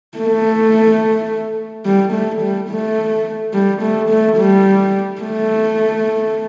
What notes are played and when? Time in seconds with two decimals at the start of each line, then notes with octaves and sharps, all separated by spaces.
0.18 A3
1.85 G3
2.13 A3
2.41 G3
2.70 A3
3.54 G3
3.82 A3
4.10 A3
4.37 G3
5.22 A3